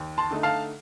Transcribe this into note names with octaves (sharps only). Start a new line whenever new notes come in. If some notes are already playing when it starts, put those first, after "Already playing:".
Already playing: D#2
A5 C6
D3 A3 D#4
F5 A5